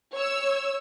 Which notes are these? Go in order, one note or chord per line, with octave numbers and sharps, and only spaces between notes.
C#5 E6